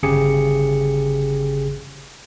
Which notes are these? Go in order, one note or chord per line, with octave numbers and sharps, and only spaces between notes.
G1 C#3 G4 G#4 C#7